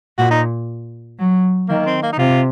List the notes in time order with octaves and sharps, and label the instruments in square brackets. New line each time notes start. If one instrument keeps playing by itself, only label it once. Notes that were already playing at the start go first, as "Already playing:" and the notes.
[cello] A#2 [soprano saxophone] F#4
[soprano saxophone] D#4
[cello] F#3
[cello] D#3 [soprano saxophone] A#3
[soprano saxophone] C4
A#3
D#4
[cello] C3 [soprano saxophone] F4